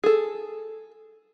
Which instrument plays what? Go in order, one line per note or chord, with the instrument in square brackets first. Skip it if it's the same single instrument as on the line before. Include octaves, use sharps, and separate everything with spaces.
[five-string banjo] G#4 A4